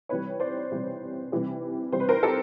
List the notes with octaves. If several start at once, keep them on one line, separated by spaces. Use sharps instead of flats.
C3 E3 G3 B4 C#5
C5 D5
C3 E3 G3
C3 E3 G3
C3 E3 G3 C5
B4
A#4 C5
G4 A4